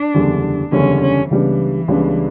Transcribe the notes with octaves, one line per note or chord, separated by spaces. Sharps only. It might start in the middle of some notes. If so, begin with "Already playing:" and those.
Already playing: D4
F#1 E2 D3 G3
F#1 E2 D3 G3 C#4
C#4
C#2 C#3 E3 G3 B3 D4
C#2 C#3 G3 B3 D4